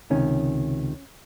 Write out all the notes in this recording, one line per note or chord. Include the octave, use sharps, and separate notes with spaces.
C#2 C3 D#3 C#4